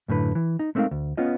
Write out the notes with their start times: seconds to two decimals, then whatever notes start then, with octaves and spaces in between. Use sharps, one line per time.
0.08 F#2 A2 D3 B4
0.35 E3
0.59 D#4
0.75 G#3 A3 C4 D#4 A#4 F5
0.91 D2
1.17 B3 C#4 F4 D#5